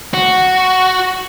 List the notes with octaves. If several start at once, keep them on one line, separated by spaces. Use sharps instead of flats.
F#4